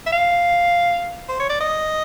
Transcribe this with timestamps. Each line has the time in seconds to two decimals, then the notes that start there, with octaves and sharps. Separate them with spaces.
0.06 E5
0.12 F5
1.29 C5
1.40 C#5
1.50 D5
1.61 D#5